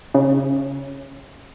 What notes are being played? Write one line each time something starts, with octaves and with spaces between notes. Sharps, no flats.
C#3